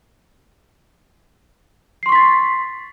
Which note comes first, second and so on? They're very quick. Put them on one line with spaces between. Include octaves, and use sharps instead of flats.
C7 C6 C#6 B6 A6